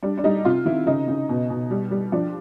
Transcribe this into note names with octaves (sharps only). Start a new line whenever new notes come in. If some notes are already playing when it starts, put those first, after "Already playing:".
G3 D4
D4
G3 D#4
C3 F4
D#3 E4
C#3 D#4
C#3
B2
B2
G3
G3
F3 D4